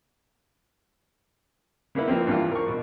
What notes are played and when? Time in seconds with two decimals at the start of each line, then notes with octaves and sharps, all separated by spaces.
1.95 C#3 A#3 B3 E4
2.08 F3 A#3 C4
2.27 G2 E3 F4
2.51 A#4 C#6
2.68 B2